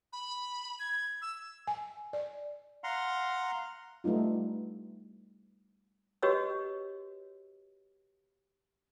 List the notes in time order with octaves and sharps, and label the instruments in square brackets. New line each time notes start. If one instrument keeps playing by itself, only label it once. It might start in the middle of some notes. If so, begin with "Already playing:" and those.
[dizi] B5
G#6
E6
[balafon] G#5
D5
[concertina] F5 F#5 A#5 C6 F6
[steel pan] G3 A3 B3 D#4 F4
[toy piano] F#4 G4 B4 C#5 D#5 E6